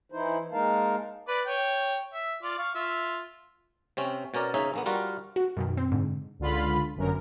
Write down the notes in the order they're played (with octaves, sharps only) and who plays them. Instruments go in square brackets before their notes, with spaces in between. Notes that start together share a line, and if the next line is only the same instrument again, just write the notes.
[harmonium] E3 D#4 E4 C5
G#3 A#3 D#4 A#4 F5 A5
[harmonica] B4 D5
C#5 G5
E5
F4 D5
F5 C#6
F4 E5
[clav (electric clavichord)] C3 C4 C#4
B2 C#4 A#4 D5
C#3 C#4 D#4 E5 G#5
A#1 A#3 B3
G3 F4 F#4 A#4
[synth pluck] F#4
F#2 B2 D#3
C4
G#2 D3
[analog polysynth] C#2 D3 F4 B5
G1 F#2 A#4